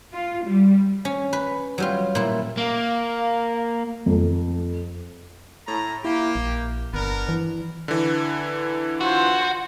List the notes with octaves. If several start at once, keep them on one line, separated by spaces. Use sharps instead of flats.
F4
G3
C#4
B4
F#3 G3 F4
A#2 E4
A#3 F5
F2
A2 A#5
A#3 E4 G4
A#1
G1 B3 D4 A#4
E3
D3 E3
F4 F#4 C5